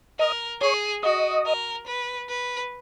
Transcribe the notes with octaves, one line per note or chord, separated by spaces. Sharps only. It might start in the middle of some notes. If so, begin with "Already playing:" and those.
A#4 D#5
G#4 C#5
F#4 D#5
A#4
B4
B4